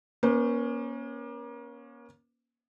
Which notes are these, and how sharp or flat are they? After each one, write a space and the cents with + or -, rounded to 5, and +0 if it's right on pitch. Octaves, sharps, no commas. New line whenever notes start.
A#3 +35 C#4 +0 C5 -40